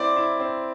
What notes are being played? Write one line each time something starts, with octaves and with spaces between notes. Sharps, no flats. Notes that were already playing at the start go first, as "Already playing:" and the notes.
Already playing: C4 E4 D5
E4
C4